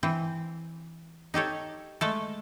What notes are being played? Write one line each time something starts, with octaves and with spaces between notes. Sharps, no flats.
E3 C4
D#4 G4 A4 C#5
G#3 A3 A4